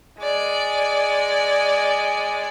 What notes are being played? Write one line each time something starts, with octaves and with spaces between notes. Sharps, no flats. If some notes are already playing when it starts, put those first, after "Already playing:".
G#3 D5